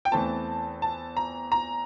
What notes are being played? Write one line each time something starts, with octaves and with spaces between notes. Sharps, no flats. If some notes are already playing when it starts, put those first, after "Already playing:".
G5
E2 E3 A3 C4 A5
A5
A#5
A#5